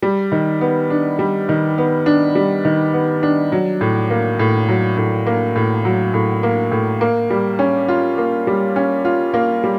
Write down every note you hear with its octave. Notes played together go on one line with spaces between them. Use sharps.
G3
D#3
B3
D4
G3
D#3
B3
D4
G3
D#3
B3
D4
F#3
A2
A#3
A2
F#3
A2
A#3
A2
F#3
A2
A#3
A2
A#3
G3
C#4
F4
A#3
G3
C#4
F4
A#3
G3